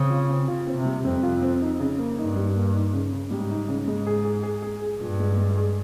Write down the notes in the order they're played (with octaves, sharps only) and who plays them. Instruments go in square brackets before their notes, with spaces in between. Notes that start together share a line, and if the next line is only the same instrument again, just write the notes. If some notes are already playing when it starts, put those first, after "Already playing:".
Already playing: [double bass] C#3 [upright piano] C4
[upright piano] F4
C4
[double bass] C#3 [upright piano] F4
[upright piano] C4
[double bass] C3
[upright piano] G3
[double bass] F2 [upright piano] C4
[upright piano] F4
C4
D#4
C#3
A#3
[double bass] G2 [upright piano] D#4
[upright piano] G3
A#3
D#4
C#3
C#3
[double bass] G#2 [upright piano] G3
[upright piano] D#4
C#3
[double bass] G#2 [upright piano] G#3
[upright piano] G#4
G#4
G#4
G#4
G#4
[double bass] G2 [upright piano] A#2
[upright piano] G#3
G#3
G#4